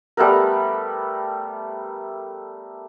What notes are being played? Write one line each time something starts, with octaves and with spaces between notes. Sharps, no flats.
G3 A3 B3 A#4